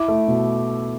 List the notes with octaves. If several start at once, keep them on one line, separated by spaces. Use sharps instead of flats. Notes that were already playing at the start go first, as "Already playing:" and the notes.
Already playing: E4 D6
A3
B2